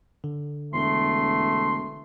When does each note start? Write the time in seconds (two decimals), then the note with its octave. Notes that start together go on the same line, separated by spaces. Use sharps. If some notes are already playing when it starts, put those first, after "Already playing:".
0.24 D3
0.73 E1 A3 C6